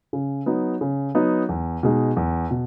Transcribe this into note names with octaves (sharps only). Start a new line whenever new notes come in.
C#3
F#3 B3 D#4
C#3
F#3 B3 D#4
E2
B2 G#3 D#4
E2
B2